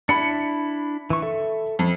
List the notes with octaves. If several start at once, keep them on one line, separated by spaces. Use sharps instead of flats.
D4 E4 B5 C#7
E3 C#6
A4 E5
F2